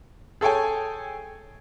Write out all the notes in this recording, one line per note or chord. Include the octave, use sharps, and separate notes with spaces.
G#4 A4 C#5 G5 G#5